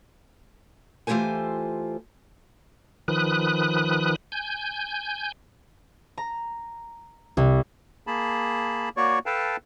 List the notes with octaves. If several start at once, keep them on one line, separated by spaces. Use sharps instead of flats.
E3 A3 F4 G4 C5 G#5
D#3 F3 B4 D#6 F#6
G#5 G6
A#5
C2
A#3 G#4 A5 B5
A#3 F#4 C#5 D5 C#6
A4 B4 F5 G5 A5